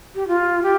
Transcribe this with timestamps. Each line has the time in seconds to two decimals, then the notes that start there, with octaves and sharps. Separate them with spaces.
0.15 G4
0.28 F4
0.62 G4